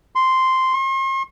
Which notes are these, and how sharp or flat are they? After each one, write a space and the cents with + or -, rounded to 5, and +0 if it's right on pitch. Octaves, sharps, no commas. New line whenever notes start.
C6 -5
C6 +45